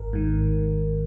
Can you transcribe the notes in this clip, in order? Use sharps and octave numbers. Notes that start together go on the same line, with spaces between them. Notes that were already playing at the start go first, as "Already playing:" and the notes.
Already playing: G#1 A#4
G#2 D#3
G#1